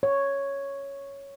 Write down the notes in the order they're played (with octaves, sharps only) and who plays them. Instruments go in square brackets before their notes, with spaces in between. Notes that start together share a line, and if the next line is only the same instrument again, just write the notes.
[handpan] C#5